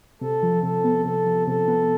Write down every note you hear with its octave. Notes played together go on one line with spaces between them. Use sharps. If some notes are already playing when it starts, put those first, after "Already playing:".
C3 A4
F3
C3 A4
B3
C3 A4
F3
C3 A4
B3